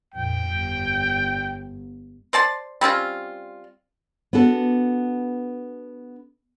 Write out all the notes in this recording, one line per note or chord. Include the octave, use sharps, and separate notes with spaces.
A#1 F2 G5
G1
C5 D5 A5 C6
G3 C4 C#4 F4
B3 D4 F#4 A4